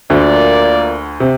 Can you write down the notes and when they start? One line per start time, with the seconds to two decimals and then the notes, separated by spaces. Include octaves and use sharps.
0.10 D2 D3 A#3 F4 A#4 D5
1.20 C3